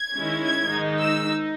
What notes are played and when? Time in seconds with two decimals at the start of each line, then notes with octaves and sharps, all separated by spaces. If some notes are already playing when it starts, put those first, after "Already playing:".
Already playing: G#6
0.15 D#3 G#3 C#4 E4
0.42 G#6
0.70 G#2 D#3 G#3 D#4
0.98 E6
1.26 D#4